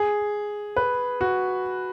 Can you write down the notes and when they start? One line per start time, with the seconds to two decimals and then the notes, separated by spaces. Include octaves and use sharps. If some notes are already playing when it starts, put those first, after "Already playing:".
Already playing: G#4
0.76 B4
1.21 F#4